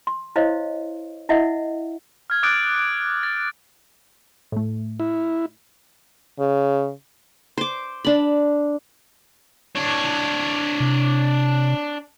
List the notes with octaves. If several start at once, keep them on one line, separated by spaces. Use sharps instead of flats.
C6
E4 C5 C#5 D#5 F5
E4 D#5 E5 F#5
F6 G#6
D6 D#6 F#6 A6 D7
D7
A6
A2 A3
E4
C#3
C5 D6
D4 B5
D4 C#5
C3